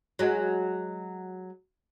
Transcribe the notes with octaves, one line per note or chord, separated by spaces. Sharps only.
F#3 G#3